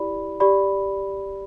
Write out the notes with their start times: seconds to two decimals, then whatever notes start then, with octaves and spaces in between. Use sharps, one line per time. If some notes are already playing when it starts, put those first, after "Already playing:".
Already playing: E4 G4 D5 B5
0.40 G4 D5 B5